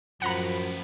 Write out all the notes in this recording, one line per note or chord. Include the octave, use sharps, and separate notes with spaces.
F#2 A2 F3 B3 F#5 A#5 B5